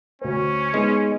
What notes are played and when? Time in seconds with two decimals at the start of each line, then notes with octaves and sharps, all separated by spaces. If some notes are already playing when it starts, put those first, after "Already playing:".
0.22 D2 C#4 C5
0.74 G#3 B3 D#4